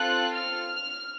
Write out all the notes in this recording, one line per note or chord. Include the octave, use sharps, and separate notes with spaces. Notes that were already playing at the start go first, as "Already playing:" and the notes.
Already playing: C4 F4 A4 F#6
F6